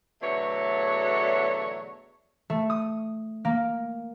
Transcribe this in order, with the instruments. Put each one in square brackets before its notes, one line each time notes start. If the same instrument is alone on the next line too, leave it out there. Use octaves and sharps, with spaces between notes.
[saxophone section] E2 B2 D3 F#3 A3 C#5
[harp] A3
D#6
A#3